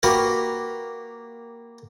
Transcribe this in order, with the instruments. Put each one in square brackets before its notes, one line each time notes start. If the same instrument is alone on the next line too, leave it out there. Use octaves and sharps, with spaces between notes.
[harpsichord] A#3 F#4 G4 A#4 B4